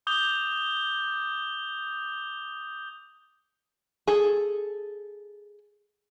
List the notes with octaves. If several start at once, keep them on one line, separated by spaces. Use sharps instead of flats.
D6 D#6 G6 F7 G7
G#4 A4